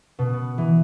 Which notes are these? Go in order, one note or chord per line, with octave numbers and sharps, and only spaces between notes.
B2
B3
E3